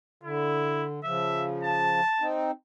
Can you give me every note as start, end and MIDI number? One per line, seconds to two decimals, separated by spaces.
0.23 1.00 50
0.23 0.84 64
1.04 2.01 49
1.04 2.01 53
1.04 1.46 76
1.63 2.28 81
2.20 2.51 60
2.20 2.51 63